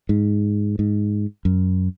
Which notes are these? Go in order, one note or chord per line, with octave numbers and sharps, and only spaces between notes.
G#2
G#2
F#2